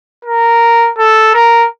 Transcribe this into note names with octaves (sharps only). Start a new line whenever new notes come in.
A#4
A4
A#4